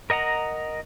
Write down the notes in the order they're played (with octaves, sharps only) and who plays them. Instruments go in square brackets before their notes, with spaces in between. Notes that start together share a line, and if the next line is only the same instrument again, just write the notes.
[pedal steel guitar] A#4 D#5 F#5 A#5